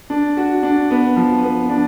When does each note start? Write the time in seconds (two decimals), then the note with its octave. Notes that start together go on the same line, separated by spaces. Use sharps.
0.10 D4
0.37 F#4
0.63 D4
0.90 B3
1.16 F3
1.43 B3
1.69 D4